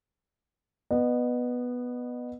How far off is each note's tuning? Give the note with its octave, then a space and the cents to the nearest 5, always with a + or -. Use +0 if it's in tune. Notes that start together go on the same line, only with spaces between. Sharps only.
B3 +0 D#5 -30